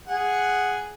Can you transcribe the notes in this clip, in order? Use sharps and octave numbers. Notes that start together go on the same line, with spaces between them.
G#4 F#5